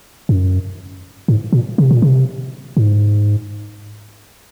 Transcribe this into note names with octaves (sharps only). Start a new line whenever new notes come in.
F#2
G#2
A#2
C3
A#2
C3
G#2